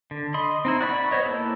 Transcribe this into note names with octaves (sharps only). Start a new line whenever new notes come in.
D3
D#5 B5 C6
C4 D#4 E4
F#4 D5 B5 C#6
B3 C5 C#5 D#5
A#3 E4 A4